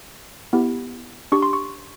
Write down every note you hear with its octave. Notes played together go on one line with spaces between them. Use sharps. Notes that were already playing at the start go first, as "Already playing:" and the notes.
B3 E4 G4
D4 G4 C#6
C6
C#6